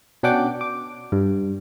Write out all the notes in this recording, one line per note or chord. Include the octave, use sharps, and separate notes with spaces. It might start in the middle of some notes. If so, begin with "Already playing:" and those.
B2 C#4 D4 F#5 G5 D6
D6
G2